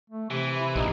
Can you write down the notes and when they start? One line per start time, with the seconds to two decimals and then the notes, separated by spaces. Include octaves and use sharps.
0.10 A3
0.31 C3 E3
0.58 E4
0.76 A#1 D#4